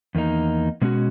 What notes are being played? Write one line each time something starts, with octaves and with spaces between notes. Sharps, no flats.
E2 D#3 A#3 D#4
B2 G#3 C#4 F#4